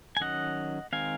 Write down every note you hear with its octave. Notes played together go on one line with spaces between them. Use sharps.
G#5
D#3 F#3 C#4 D#5 F#5
D#3 G#3 C4 F5 G#5